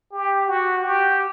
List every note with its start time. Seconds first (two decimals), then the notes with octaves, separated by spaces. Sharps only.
0.12 G4
0.48 F#4
0.83 G4